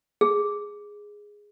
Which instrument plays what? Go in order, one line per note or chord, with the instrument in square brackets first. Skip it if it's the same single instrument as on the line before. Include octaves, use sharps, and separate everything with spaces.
[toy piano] G#4